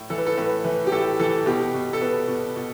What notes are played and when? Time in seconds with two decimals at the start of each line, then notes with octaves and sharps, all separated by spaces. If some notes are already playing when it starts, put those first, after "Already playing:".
Already playing: A2
0.10 E3 A4
0.18 B4
0.27 A4
0.37 A2 B4
0.64 E3 B4
0.87 G4
0.92 A2 A4
1.20 E3 A4
1.46 B2 G4
1.74 B2
1.93 A4
2.01 B2 B4
2.28 B2
2.56 B2